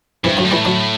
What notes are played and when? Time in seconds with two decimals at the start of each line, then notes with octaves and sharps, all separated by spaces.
0.24 G2 C3 E3
0.37 D3 F#3
0.44 A2
0.51 E3 G3
0.65 D3 F#3